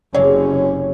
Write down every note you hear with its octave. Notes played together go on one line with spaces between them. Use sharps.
F#1 C3 G#3 C#4 C#5